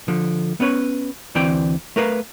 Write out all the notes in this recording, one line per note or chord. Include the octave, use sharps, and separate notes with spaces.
D3 F3
B3 C#4 B4 C#5
D2 E3 C4 D5 G5
A3 A#4 B4 D5 F5